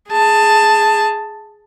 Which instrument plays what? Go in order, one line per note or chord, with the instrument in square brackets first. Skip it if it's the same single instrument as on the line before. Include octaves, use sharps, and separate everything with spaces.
[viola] G#4 A5